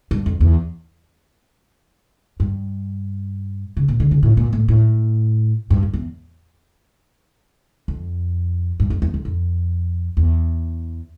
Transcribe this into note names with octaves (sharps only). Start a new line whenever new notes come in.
G2
F2
E2
G2
C#3
A#2
D3
C#3
A2
A#2
A2
A2
G2
F2
E2
F2
G2
F2
E2
F2
F2
E2